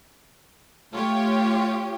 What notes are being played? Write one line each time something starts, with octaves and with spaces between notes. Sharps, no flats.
A3 F4 G4 C#5